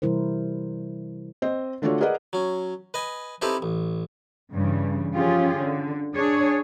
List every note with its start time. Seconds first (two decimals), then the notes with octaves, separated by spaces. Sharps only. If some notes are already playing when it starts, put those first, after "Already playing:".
0.02 C3 E3 G3 E4 A#4 C5
1.42 C4 C5 D#5
1.82 D3 A3 D4 F4 F#4 C#5
2.01 G#4 A#4 B4 D5 D#5 F#5
2.33 F#3 C#4
2.94 B4 D#5 G#5
3.42 C4 D#4 E4 G4 A4 B4
3.62 A1
4.53 G2 C#3 E3 G3
5.15 F3 C#4 F4 G4 G#4
5.58 D3
6.14 D4 G#4 C#5